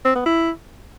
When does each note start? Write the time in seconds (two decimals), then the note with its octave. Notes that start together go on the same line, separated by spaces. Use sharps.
0.05 C4
0.15 B3
0.26 E4